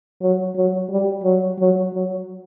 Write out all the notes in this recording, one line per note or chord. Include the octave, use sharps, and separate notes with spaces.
F#3
F#3
G3
F#3
F#3
F#3